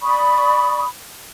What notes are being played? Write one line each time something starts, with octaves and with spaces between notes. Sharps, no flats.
D5 B5 C#6 D#6